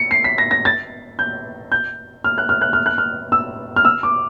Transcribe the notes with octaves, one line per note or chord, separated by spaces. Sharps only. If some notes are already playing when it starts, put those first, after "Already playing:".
Already playing: C#7
C7
B6
A#6
A#6
A6
G6
G6
F6
F#6
F6
F#6
F6
F#6
F6
E6
F6
E6
D6